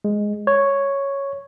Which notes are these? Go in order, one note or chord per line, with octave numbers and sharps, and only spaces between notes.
G#3
C#5